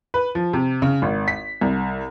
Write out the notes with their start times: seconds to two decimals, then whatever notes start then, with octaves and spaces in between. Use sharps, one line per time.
0.14 B4
0.35 F3
0.53 C3
0.82 C#3
1.02 G#1
1.28 B6
1.61 C2